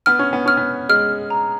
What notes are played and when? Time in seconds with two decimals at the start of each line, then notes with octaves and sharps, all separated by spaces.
0.06 B3 F6
0.19 C#4
0.33 B3
0.46 C#4 F6
0.57 B3
0.89 G#3 F6
1.30 A#5